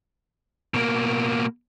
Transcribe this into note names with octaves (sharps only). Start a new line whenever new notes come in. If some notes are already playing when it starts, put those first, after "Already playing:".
B2 A#3